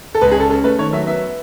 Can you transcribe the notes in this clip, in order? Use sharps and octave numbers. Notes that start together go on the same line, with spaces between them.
A4
C#2 B4
G#4
C#4 A4
C#4 A4
A3 B4
D#3 C#5
F#3 E5
B3 E5